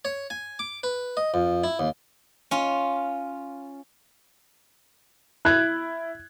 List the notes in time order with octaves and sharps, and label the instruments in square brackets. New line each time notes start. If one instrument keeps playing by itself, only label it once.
[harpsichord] C#5
G#5
D6
B4
D#5
F2
E4
D#2
[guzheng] C#4 F4
[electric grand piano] E4 [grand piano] F#6 G#6